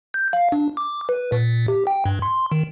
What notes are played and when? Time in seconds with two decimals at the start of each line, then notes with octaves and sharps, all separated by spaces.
0.14 G6
0.33 F5
0.52 D4
0.77 D6
1.09 B4
1.32 A#2
1.68 G4
1.87 G5
2.06 G2
2.22 C6
2.37 C6
2.52 D#3